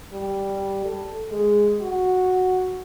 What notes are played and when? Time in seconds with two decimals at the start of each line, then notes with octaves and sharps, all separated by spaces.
0.13 G3
0.85 A4
1.31 G#3
1.81 F#4